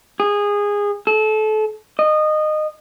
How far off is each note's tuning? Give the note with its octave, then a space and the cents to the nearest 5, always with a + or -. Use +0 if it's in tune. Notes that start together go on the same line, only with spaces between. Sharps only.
G#4 -20
A4 -30
D#5 -20